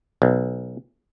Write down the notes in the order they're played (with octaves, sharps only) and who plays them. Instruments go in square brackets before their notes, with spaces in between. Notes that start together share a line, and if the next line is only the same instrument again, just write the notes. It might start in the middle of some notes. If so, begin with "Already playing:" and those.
[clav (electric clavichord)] B1